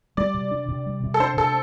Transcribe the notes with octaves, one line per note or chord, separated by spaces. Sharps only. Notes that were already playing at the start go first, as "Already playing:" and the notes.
G3 D5
C3
D4
C3
G3
C3
A4
D4 C5
C3 A4